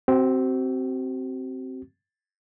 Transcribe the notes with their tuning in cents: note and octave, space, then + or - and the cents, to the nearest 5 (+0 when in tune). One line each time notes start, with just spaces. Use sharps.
C4 +0 F#4 +40